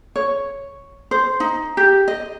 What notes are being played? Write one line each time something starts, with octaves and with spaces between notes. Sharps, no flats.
C#5
C5
D#4
G4
D#5